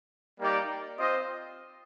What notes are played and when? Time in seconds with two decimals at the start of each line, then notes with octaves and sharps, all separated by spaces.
0.39 G3 A#3 D#4 G4 D5
0.98 C4 F4 C5 D#5